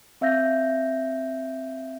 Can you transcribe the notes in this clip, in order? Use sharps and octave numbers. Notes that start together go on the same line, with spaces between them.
C4 E5 F5 G6 A#6